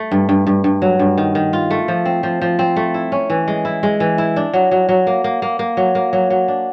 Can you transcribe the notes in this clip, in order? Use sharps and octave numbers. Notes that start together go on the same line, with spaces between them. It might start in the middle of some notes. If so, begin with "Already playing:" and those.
Already playing: A3
G2
G2
G2
G2
F#3
G2
D#3
D#3
F4
A3
F3
C4
F3
F3
C4
A3
E4
C#4
E3
G#3
E4
G#3
E3
E4
D4
F#3
F#3
F#3
A#3
A#3
A#3
A#3
F#3
A#3
F#3
F#3
D4